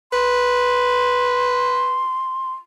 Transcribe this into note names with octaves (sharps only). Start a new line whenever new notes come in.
B4 C6